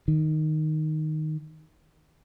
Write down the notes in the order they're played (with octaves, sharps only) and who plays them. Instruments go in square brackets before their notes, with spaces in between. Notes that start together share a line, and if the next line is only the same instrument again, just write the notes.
[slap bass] D#3